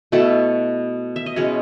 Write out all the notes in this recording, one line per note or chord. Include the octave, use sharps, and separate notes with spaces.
B2 A3 E4 A4
E5
D#5
B2 G#3 C#4 E4 C#5